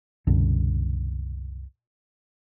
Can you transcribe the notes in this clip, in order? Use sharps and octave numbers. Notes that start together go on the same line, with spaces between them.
C2 F#2 B2 D3